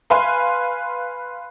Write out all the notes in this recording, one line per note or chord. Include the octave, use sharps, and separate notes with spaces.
B4 F5 G#5 C6